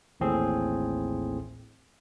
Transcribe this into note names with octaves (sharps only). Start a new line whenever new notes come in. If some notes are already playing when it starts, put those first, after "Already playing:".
A1 D#2 A2 C4 G#4